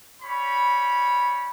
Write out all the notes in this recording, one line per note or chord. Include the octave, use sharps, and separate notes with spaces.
G3 C#5 B5